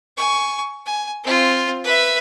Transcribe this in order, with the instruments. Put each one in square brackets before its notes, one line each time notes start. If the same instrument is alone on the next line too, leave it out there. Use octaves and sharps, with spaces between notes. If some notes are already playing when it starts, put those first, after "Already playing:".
[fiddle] G#5 C#6
G#5
C4 F4
B4 E5